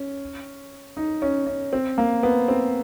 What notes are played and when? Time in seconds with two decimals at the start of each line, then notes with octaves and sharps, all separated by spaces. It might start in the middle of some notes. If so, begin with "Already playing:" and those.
Already playing: C#4
0.97 D#4
1.22 C#4
1.47 C#4
1.73 C4
1.98 A#3
2.23 B3
2.48 C4